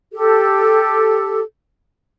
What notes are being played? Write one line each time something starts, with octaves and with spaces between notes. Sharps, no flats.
G4 A4